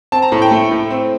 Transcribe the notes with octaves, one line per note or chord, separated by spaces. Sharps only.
C4 A5
A#5
A2 A5
G5
A3
A2
C4